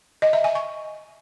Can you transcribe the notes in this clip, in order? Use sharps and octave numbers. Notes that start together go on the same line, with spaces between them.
D#5
E5
G#5
C#6